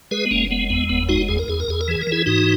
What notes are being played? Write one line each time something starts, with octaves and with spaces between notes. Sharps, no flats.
G#3 G#4 B4
B3
F#1 A#3 C#4
G#3 B3
E2 B3
F#1 B3
G#3 D#4 F#4
E2 G#4
A#4
E2 G#4
A#4
E2 G#4
A#4
E3 G#4
A#4
E3
E4 G#4
G#2 D#4 F#4